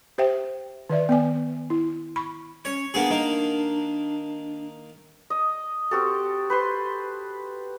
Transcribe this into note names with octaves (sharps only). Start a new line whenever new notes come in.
G4 C5 E5 G5
D#3 B4 D5 E5
B3 D5 G#5
E4
B5 C#6
C#4 C#5
A#3 B3 D4 G#4
D#3 A#3
D#5
C4 F#4 G4 A4
B4 C5 C6